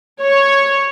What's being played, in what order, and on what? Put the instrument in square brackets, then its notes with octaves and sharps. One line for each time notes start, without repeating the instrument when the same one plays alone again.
[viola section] C#5